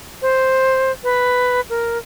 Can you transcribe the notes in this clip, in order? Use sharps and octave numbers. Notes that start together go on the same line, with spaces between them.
C5
B4
A#4